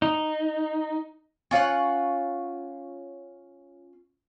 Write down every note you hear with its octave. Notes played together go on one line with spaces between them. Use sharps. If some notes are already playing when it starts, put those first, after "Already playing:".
D#4
C#4 F4 C#5 F#5